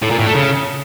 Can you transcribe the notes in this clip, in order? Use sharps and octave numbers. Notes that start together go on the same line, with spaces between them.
A2
A#2
A2
A3
C#3